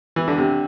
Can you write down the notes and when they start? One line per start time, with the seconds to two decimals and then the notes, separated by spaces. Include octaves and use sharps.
0.16 E3
0.28 D3
0.38 C3